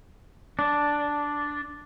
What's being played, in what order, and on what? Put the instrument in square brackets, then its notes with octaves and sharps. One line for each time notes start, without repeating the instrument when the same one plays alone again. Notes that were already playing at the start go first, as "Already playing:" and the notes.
[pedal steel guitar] D4